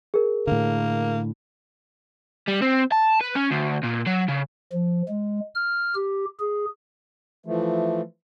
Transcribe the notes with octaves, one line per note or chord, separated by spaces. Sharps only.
G#4 A#4
A2 D3 A#3
G3
C4
A5
B4
C#4
D2
A#2
F#3
C#3
F3
G#3
F6
G4
G#4
E3 F3 A3